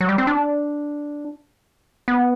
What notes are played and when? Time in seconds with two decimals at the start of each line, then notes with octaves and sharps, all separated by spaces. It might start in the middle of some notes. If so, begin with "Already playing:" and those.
0.01 F#3
0.09 G3
0.18 C4
0.27 D4
2.08 B3